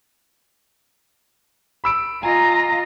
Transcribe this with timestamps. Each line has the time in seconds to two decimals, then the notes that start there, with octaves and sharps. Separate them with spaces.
1.84 B5 E6 D7
2.23 F4 D#5 G#5 A#5